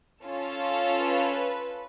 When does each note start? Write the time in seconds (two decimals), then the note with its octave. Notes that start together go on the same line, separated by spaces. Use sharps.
0.23 C#4 F4 A4
1.00 B4